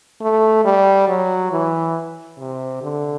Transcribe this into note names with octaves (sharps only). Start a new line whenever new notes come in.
A3
G3
F#3
E3
C3
D3